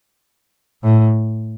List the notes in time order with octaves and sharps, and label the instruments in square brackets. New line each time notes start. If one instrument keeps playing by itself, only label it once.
[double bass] A2